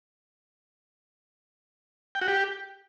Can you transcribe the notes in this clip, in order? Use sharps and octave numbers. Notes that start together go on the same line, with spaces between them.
G5
F#4
G4